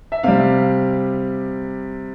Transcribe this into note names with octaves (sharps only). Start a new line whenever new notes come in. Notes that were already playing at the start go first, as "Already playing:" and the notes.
E5
C3 G3 F5